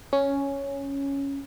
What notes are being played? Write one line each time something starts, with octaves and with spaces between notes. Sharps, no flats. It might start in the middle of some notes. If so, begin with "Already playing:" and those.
C#4